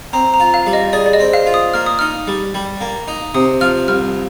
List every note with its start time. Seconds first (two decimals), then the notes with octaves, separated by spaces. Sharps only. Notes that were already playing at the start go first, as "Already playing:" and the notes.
0.13 C4 A#5
0.34 A#5
0.40 F4
0.54 F5
0.66 G3
0.73 D#5
0.93 G#4 D5
1.06 D5
1.13 D#5
1.20 C4
1.33 F5
1.46 F4
1.54 D#6
1.74 A#3 F6
1.86 D#6
1.99 D#4 F6
2.27 G3
2.54 G3
2.80 A#3
3.08 D#4
3.34 C3 D#6
3.61 F3 F6
3.88 C2 F6